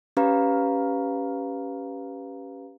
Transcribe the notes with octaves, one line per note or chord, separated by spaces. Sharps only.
C#4 G4 B4 F5 A#5